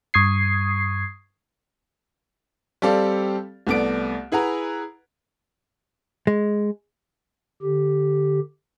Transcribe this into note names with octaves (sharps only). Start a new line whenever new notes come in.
G2 C#6 D#6 G#6 C7
G3 C4 G4 A4 D5 F5
C2 A3 B3 D5 D7
E4 G#4 B4 F#5 A#5
G#3
D3 G4